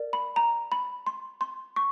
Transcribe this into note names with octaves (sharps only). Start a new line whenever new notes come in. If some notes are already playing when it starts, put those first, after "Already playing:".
Already playing: A#4 D5
B5
A#5
B5
C6
C6
C#6